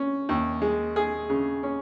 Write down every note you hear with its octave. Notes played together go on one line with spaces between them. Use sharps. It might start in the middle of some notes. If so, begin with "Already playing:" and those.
Already playing: C#4
D#2
G#3
G#4
C#3
C#4